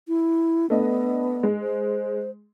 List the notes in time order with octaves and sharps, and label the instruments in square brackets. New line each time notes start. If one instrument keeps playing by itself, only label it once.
[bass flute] E4
[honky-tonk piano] A3 D4 D#5 [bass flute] B3
[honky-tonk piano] G#3
[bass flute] C5